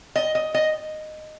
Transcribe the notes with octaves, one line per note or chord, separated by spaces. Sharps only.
D#5
D#5
D#5